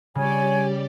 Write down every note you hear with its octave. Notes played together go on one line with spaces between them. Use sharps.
C#3 G3 G4 C#5 D5 G#5